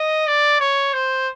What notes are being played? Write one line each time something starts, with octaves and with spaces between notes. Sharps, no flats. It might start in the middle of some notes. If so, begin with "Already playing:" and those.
Already playing: D#5
D5
C#5
C5